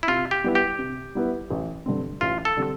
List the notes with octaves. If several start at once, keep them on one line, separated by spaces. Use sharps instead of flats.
E4
C3 F4
G4
G3 B3 E4 B4
G4
C3
G3 B3 E4 B4
A1
G2 D3 G3 C4
A1 F4
A4
D3 G3 C4